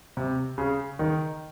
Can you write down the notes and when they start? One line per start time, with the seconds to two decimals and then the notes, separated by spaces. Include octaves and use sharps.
0.17 C3
0.58 C#3
0.99 D#3